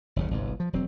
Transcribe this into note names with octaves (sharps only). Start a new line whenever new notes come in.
F#1 D#2 C#3
G1 C2 G#2
F3
E1 F#3 C4